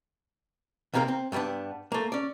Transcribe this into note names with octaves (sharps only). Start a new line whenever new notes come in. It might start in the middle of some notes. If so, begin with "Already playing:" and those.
D#2 C3 A#3 C4 A#4
C4
G2 G3 A3 B3 D4
A3 A#3
C#4 D5